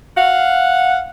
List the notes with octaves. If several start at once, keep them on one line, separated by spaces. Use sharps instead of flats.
F5 F#5